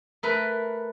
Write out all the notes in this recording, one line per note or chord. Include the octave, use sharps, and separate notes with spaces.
A3 A#4 B4